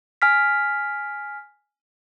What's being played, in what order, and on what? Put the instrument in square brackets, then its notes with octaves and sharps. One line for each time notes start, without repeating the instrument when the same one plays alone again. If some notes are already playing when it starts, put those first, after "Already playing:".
[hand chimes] G#5 F6 B6